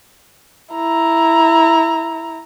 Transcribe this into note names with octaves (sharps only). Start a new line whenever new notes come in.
E4 A#5